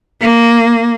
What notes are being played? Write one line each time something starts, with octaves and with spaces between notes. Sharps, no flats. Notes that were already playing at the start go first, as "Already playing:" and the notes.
A#3